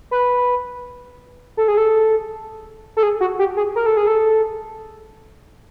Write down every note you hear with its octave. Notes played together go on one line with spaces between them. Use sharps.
B4
A4
G#4
A4
A4
G#4
F#4
G4
G#4
A#4
A4
G#4
A4